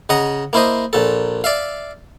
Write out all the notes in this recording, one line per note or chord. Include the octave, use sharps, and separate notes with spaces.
C#3 D#5 F#5 A#5
A#3 E4 C5 D#5
A#1 A#2 A4
D5 E5 F5